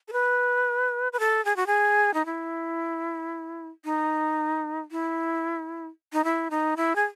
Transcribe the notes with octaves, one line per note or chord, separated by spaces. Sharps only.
A4
B4
B4
A4
G#4
F#4
G#4
D#4
E4
D#4
E4
D#4
E4
D#4
E4
G#4